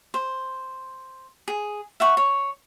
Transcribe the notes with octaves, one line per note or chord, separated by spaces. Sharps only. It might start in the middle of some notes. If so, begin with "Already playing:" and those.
C5
G#4
E5 F#5 C#6
C#5